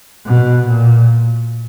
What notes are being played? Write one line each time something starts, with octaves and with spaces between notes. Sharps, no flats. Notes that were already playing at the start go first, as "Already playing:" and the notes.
B2
A#2